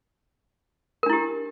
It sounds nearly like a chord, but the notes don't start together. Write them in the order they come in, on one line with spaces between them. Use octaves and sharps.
A#4 D4 E4 G4